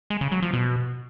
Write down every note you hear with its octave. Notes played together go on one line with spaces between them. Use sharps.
G#3
C#3
F#3
F3
B2